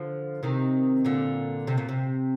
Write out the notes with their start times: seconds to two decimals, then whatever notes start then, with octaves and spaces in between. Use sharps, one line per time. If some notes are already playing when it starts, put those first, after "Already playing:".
Already playing: D3 F3
0.43 C3 D#3
1.05 A#2 D3
1.67 C3
1.78 A#2
1.89 C3